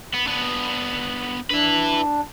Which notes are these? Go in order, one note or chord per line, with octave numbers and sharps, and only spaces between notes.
B3
B3 D4
D4 E4 B4